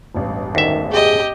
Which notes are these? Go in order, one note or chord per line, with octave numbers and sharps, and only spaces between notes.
E1 A1 G2
D2 D#3 E5
G4 G#4 D#5